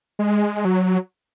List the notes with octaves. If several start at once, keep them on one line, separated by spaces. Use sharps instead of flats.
G#3
F#3